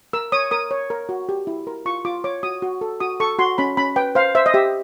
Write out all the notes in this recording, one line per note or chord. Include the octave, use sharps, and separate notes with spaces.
A#4 E6
C#5 D#6
A#4 D#6
C#5
A#4
F#4
G4
E4
A#4
F4 C#6
F4 D6
C#5 D6
F#4 D#6
F#4
A4
F#4 D#6
A4 C#6
F#4 C6
C#4 B5
C#4 B5
B4 G5
C5 F5
C5 E5
D#5
G4 E5